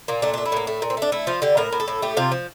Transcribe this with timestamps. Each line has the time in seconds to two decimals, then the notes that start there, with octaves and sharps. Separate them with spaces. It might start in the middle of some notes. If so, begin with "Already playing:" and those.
0.08 A#2 A#3
0.22 A3 D4
0.34 A3 D4
0.46 E4
0.52 A2 A#3
0.67 A3
0.82 A#2
0.90 C4
0.97 A3 D4
1.12 A3 E4
1.27 F3 F4
1.42 D3 G4
1.57 A2 A#4
1.72 A2
1.80 A4
1.88 A2
2.02 A3 G4
2.17 C3 F4
2.32 F3